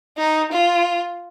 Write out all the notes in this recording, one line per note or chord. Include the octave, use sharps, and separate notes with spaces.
D#4
F4